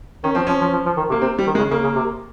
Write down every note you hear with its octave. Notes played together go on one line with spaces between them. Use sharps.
D#3 C#4
F3 C4
F3 C#4
F3
F3
F3
D#3
C3 A#3
C3 C4
G3
D#3
G#3
C#3
C#3 A#3
C#3
C3